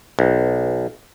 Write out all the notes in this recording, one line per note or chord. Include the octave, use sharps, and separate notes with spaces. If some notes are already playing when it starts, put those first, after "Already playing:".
B1